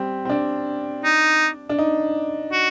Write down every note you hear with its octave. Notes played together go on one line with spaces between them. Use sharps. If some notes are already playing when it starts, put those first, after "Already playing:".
Already playing: G3 C4
C4
D4
D#4
D4
D#4
F#4